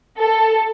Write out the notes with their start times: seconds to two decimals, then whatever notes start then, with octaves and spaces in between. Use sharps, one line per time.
0.19 A4